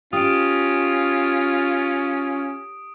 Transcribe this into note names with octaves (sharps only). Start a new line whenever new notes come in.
C#4 F4 G4 D#6 D7